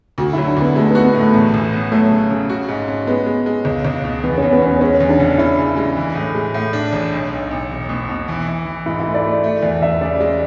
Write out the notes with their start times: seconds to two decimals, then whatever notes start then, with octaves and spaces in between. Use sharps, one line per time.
0.18 D2 F#4
0.33 F#3 E4
0.47 D4
0.57 D2 B3
0.70 B3
0.76 G#3 A3
0.91 B3 F#4
1.05 B3
1.14 A2
1.20 A3
1.34 A1
1.54 A1
1.72 B3
1.91 F#3 A3
2.11 C#3
2.30 C#3
2.50 F#4
2.69 G#2
2.88 C#4
3.07 G#3 B3
3.26 G#3
3.46 G#3
3.65 C#2
3.85 C#2
4.04 B2
4.23 E2 B3
4.38 E2 C#4
4.52 B3
4.62 E2 C#4
4.81 G#3 C#4
5.00 E2
5.09 D4
5.19 F#1
5.38 C#4 E4
5.58 C#3
5.77 G#3
5.96 E3
6.15 A2
6.35 G#3
6.54 A2
6.73 D4
6.93 A1
7.12 B1
7.31 B1
7.51 B1
7.70 E1
7.89 B2
8.09 B2
8.28 E3
8.47 E3
8.66 E3
8.86 G#2 E4
9.00 A3 E4
9.14 D5
9.24 A3
9.44 A3
9.62 E2 D5
9.82 E2 E5
10.01 C#3 D5
10.21 G#3